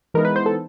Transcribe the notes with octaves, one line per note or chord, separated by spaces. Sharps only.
E3 G#3 B3 D#4 A#4
B4
C5
A4